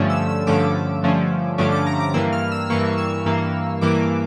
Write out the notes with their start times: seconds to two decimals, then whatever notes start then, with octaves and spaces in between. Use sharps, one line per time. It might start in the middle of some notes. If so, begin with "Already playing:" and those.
Already playing: G2 D3 F3 A3 C#4
0.10 E6
0.29 E6
0.47 G2 D3 F3 A3 C#4 D6
1.03 G2 D3 F3 A3 C#4
1.58 G2 D3 F3 A3 C#4 D6
1.72 D6
1.86 A#5
2.00 D6
2.14 G2 E3 A#3 E6
2.33 F6
2.52 E6
2.70 G2 E3 A#3 C#6
2.98 E6
3.26 G2 E3 A#3
3.81 G2 E3 A#3 D6